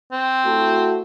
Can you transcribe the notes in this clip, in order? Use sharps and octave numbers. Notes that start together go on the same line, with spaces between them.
C4
A3 E4 F#4